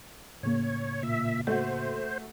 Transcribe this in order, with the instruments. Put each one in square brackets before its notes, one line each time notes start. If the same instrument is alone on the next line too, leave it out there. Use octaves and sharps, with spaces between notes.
[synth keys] A2 C#3 A#3 [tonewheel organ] C#5
[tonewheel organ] A#2 E5
[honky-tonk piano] A3 F#4 [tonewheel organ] C5